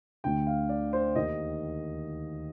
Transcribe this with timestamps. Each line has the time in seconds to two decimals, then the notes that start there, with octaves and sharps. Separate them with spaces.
0.24 D2 D3 G5
0.47 F5
0.69 D5
0.93 C5
1.16 D#2 D#3 D#5